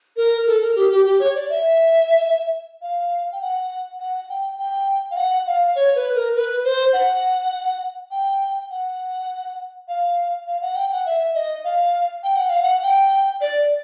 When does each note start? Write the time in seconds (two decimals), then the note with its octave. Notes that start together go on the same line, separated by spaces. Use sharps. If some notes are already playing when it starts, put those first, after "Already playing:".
0.17 A#4
0.46 A4
0.62 A#4
0.76 G4
0.91 G4
1.05 G4
1.20 C#5
1.35 D5
1.50 E5
2.82 F5
3.32 G5
3.41 F#5
4.00 F#5
4.29 G5
4.59 G5
5.11 F5
5.17 F#5
5.47 F5
5.76 C#5
5.96 B4
6.15 A#4
6.36 B4
6.64 C5
6.93 F#5
8.11 G5
8.71 F#5
9.88 F5
10.47 F5
10.62 F#5
10.76 G5
10.91 F#5
11.06 E5
11.35 D#5
11.64 F5
12.24 G5
12.36 F#5
12.49 F5
12.63 F#5
12.83 G5
13.41 D5